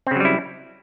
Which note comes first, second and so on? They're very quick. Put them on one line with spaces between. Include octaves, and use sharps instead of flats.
C4 C#3 F#3 G3 E4